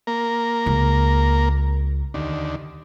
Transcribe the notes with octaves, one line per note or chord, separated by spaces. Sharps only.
A#3 A#4
C#2
D#2 D3